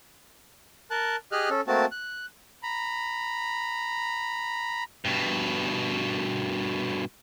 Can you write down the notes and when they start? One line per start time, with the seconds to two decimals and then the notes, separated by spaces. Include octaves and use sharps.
0.91 A#4 A5 F#6
1.32 G4 G#4 D#5 F6 F#6
1.50 C#4 A4
1.67 A3 A#3 C4 F#4 A5
1.92 F#6
2.63 A#5 B5
5.05 G2 B2